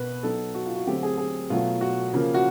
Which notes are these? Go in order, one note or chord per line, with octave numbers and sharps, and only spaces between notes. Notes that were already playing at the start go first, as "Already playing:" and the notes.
Already playing: B2 B4
F#3 B3 D#4 A4
F#4
F4
F#4
D3 F#3 A3 C4 G4
G#4
G#4
B2 F#3 A3 F4
F#4
C#3 F3 A#3
F#4